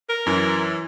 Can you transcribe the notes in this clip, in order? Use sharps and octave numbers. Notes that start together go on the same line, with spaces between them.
A#4
F#2 E3